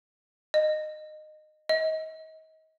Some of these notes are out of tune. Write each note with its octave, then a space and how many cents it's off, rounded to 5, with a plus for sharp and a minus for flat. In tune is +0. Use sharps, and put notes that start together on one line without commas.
D#5 -20
D#5 +30